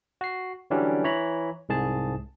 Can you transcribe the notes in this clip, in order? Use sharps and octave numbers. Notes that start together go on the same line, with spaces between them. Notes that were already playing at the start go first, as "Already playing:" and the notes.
F#4 C7
D3 E3 F#3 G3 C#4 D4
E3 C#5 A#5 B5
C2 G#2 G#4 A5